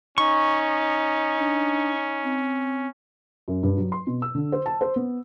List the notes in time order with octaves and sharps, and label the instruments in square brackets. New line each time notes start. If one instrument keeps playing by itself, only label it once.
[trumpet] C#4 [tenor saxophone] D#4 [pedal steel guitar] C#6
[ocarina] D4
C4
[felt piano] F#2
G2
F#3
C6
B2
E6
D3
C5
A5
C5
B3